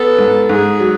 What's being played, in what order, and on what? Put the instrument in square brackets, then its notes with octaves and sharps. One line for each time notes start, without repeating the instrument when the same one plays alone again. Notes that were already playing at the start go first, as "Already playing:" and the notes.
Already playing: [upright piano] B3 [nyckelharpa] A4
[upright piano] G#2
[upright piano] G#2 [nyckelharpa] G#4
[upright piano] F#3